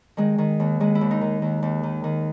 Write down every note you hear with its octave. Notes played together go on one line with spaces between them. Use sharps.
D#3 G#3
D#3
D#2
D#3 G#3
E4
D#2
D#4
D#3
D#2
D#2
D#3
D#3